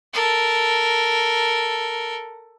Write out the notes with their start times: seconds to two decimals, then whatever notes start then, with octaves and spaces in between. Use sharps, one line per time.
0.13 A4 A#4